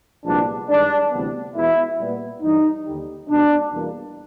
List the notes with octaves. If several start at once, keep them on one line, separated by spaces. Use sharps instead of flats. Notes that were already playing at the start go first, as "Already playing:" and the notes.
C2 A#2 F3 G#3 B3 D4
G2 D#3 G#3 D4
D2 C3 E3 G3 B3
E2 B2 G#3 B3 E4
A#2 G3 B3
G2 E3 G3 D#4
D#2 D3 G3
B2 G#3 B3 D4
E2 B2 G3 A#3